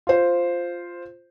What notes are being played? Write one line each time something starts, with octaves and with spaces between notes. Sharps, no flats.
F4 C5